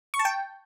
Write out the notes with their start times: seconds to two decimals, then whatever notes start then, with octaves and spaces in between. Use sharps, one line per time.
0.14 C#6
0.19 A5
0.25 G5